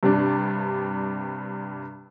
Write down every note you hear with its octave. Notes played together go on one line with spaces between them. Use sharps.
G2 C3 G3 D4